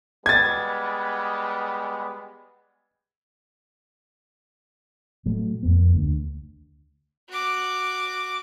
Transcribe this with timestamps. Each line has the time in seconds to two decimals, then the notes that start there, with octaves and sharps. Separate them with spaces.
0.26 G3 G#3 B3 G#6 A6
5.26 A2 F#3 A3
5.63 F2 A#3 B3
5.95 D2
7.30 F#4 D6